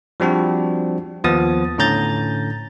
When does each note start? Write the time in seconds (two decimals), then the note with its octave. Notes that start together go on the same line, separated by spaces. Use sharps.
0.20 F3 G3 C4 D4 F#4
1.24 D#2 F3 B3 D#6 A6
1.78 A2 D3 C#4 A#5 G6 A6